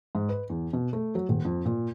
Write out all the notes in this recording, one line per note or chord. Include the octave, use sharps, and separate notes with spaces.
G#2
B4
E2
B2
A3
F#3
D#1
F2
A#2